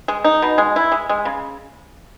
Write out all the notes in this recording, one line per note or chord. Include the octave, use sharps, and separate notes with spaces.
G#3
D#4
B2
G#3
E4
G#3
G#3
C#3